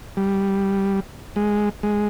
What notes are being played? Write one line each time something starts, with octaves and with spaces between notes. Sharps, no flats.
G3
G#3
G#3